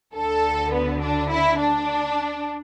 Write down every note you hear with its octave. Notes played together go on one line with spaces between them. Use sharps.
D2 D3 A4
B3
D4
E4
D4